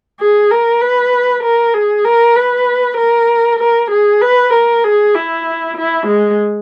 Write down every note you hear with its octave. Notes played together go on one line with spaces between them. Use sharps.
G#4
A#4
B4
A#4
G#4
A#4
B4
A#4
A#4
G#4
B4
A#4
G#4
E4
E4
G#3